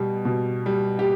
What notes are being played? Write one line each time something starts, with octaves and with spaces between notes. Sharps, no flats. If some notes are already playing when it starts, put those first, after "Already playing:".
Already playing: B2 G3
B2
G3
G4